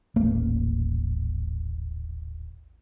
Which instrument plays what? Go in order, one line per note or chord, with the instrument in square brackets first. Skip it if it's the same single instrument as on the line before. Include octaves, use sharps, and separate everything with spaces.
[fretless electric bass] D#1 A1 A3 A#3